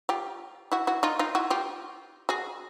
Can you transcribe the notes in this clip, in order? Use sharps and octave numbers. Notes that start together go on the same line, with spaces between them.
F4 G4
E4 F#4
E4 F#4
D#4 F4
D#4 F4
E4 F#4
F4 G4
F#4 G#4